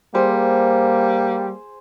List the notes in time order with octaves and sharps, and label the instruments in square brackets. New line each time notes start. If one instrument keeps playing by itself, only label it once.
[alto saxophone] G3 [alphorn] A#3 [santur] G#4 C5